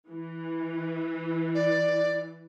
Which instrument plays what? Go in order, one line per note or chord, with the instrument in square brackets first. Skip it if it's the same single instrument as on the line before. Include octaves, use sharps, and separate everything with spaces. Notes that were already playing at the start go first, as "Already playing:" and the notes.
[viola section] E3
[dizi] D5